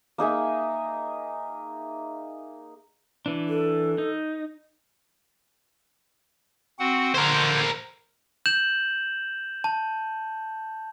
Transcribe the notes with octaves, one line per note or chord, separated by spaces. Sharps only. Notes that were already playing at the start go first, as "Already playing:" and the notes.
A#3 D#4 G#4 E5
E3 D4
A4
D#4
C4 F#4 F#5
D3 A#4 C5 G6 G#6
G6 E7 F#7
A5